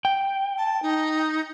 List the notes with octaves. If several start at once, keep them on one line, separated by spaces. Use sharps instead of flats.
G5
A5
D#4